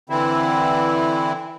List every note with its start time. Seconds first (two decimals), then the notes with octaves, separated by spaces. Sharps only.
0.10 D3 E3 C4 E4